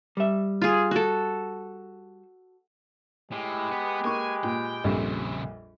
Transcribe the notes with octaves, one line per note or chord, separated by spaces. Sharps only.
G3 E5
F4 G#4
F#4 A4
A2 G#3 G4 B4
B3
A#3 G#5 C#6
A#2 G5
A#1 F2 C#3 G3 C4